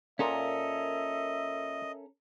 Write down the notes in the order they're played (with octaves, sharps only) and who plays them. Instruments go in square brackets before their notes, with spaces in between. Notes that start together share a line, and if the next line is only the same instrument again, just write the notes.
[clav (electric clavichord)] A#2 [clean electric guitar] C#4 A4 A#4 [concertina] D#5 [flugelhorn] E5